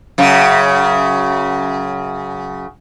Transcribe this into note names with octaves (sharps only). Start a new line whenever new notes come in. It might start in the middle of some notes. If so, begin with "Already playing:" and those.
F#2 C#3